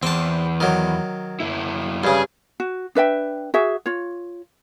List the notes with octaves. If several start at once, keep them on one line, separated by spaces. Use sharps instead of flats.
E2 C4 A5
D#3 F#3
F#2 E4
G2 C#3 G#4
F#4
D4 B4 E5 G5
F#4 G#4 E5
F4 C#5